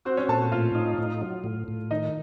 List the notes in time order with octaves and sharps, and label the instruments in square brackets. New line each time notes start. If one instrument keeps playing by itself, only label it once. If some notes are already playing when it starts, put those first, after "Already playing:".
[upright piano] C4 C5 [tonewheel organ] F#4
[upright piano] C#4 C#5
[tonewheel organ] A#2 [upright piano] A4 A5
[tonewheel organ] A2 [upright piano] F4 F5
[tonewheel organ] D#4
A2
F#3
A2
A2
[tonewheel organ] D#3 [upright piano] D#4 D#5